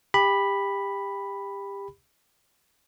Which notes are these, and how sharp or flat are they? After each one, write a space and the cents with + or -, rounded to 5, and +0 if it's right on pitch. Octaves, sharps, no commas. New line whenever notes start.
G4 +25 B5 +0